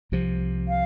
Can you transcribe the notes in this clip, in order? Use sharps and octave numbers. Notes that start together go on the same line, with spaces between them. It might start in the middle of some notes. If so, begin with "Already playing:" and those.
C2 C3 F3
F5